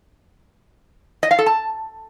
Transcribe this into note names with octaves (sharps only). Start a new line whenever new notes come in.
D#5
F5
A4
A5